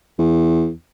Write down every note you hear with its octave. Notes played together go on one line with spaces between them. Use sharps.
E2